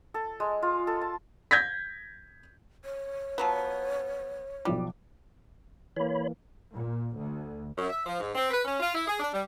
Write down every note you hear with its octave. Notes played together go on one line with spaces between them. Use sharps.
A4
G#3
F4
A4
A5
G6 G#6 A#6 B6
C#5
F3 F#3 B3
B1 F3 G3 D6
E3 A#3 C#5 B5
A#2
D2
F#2
E5
F3
G#2
C4
B4
C#4
F4
E4
G#4
D4
G3